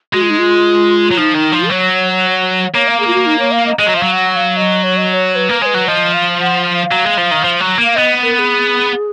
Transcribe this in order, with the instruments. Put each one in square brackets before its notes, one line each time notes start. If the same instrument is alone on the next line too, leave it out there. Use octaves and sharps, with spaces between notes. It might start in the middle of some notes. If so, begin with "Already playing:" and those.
[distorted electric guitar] G#3 [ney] F#4
[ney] F4
D#4
F4
[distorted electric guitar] F#3
[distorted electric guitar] F3 [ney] D#4
[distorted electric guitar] D#3
F3
[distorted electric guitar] F#3 [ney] C#5
[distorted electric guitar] A#3 [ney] C#5
[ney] F5
G#4
F4
F#4
D#4
C#5
F5
D#5
[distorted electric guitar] G#3 [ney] D#5
[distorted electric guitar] F#3
[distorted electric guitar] F3 [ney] F5
[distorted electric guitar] F#3
[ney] F#5
F#5
F5
D#5
C#5
D#5
D#5
C#5
B4
[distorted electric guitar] A#3
[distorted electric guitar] G#3 [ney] C#5
[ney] B4
[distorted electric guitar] F#3
[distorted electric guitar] F3 [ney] D#5
[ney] F5
F#5
F5
[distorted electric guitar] F#3
G#3
F3
D#3
F3
F#3
A#3
[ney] F5
[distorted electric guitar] B3 [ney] D#5
[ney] A#4
A#4
G#4